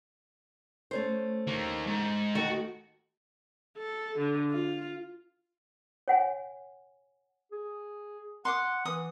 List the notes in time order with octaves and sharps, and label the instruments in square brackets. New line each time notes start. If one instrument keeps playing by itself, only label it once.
[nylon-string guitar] A3 C#4 C5
[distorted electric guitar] D#3 A#3
G#2
[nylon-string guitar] D2 D#3 A3 [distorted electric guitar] F#4
[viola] A4
D3
F4
[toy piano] C#5 F#5 G#5
[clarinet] G#4
[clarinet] F#5 [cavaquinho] C6 D6 D#6
[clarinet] E3 [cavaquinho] D#6